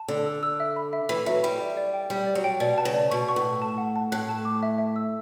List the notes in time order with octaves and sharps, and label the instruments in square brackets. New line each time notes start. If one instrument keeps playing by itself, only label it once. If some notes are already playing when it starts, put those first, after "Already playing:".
Already playing: [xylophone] A5
[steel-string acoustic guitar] D3 [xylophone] D5
[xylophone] E6
E6
E5
B5
E5
[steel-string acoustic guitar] E3 [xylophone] B5
[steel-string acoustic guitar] F#3 [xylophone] E5
[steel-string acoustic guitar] G3 [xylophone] B5
[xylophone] D5
D5
G5
[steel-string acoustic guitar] G3 [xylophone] G4
[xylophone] D5
[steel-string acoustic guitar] F#3
[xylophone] G5
[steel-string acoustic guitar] B2 [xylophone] D5
[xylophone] A5
[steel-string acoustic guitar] C#3
[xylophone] D5
[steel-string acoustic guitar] B2 [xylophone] C#6
[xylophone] C#6
[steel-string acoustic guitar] A2
[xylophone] A5
A5
F#5
A5
[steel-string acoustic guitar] A2 [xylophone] F#6
[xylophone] A5
D6
E5
E5
E6